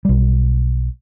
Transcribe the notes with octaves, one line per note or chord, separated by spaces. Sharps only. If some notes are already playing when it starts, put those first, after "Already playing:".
B1 G3